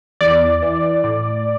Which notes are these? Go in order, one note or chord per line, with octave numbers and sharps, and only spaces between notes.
E2 D5
E3
A2